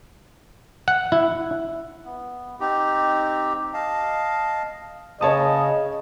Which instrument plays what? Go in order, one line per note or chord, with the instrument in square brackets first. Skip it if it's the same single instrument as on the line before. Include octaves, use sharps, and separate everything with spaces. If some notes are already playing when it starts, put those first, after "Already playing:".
[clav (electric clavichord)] F#5
E4
[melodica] B3
C4 D#4 G4
D#5 F5 A5
[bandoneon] C#3 [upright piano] C#5 A5 D#6 [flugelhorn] D#5